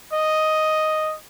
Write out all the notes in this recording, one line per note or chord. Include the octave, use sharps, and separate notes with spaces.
D#5